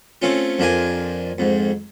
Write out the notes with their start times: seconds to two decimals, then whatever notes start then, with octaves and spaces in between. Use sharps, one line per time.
0.22 A3 C4 C#4 F4
0.59 F2 F3 D4 A#4 G#5
1.38 F2 G#2